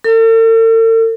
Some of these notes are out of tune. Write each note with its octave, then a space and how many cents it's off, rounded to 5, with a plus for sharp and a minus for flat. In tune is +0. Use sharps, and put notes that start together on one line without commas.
A4 +45